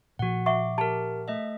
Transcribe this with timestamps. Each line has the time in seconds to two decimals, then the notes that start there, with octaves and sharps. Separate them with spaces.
0.19 A#2 F3 F#4 F#5
0.46 E5 F#5 C#6 D6
0.78 G4 A#4 A5
1.28 A3 D#5 E5